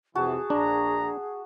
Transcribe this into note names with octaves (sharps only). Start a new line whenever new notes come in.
F2 C3 E3 F#4 G#4 A5
A#1 D4 A#5